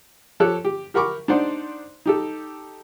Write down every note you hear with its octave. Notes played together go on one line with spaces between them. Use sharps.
F3 G4 A4 C#5 F#6
G4
G4 A#4 F#5 B5 C#6 D6
D4 D#4 C5 D5 F#5 C6
D#4 G4 A4